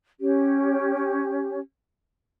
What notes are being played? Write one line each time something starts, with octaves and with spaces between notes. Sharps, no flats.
C#4 G4